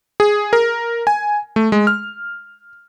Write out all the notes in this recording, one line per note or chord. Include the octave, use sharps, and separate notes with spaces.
G#4
A#4
G#5
A3
G#3
F6